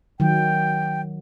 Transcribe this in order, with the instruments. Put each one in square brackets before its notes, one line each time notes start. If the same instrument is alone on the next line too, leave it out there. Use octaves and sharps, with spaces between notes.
[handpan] D#3 F#3 [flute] G5